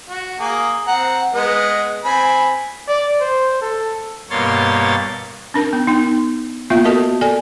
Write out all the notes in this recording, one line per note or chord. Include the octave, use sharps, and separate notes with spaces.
F#4
A#3 G#4
C4 F#5 A#5
G#3 B3 D#5
C4 G#5 B5
D5
C5
A4
G2 B2 A#3 C#5 C6 A6
C#4 D4 A#4
B3
B3 D#4
A#3 B3 F4 E5
F#4 A4 A#4 D#5 A5
A4 D5 G#5